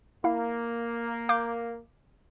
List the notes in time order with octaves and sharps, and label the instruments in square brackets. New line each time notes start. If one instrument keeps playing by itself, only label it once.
[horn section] A#3 [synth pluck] E4 F5
[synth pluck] F5 D6 G6